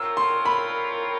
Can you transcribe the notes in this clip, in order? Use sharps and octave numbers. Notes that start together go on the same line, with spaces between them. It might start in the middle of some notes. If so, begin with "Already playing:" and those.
Already playing: C4 F4 A#4 C#5 E6
C6
B5